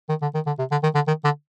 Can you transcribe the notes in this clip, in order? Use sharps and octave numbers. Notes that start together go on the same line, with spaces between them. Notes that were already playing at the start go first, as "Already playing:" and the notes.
D#3
D3
D#3
D3
C3
D3
D#3
D3
D#3
D3